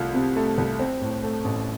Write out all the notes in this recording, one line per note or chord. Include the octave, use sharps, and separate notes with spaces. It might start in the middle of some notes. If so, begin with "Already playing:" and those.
Already playing: C2 A3 F4
C3
A3
C2
C4
A2
A3
A1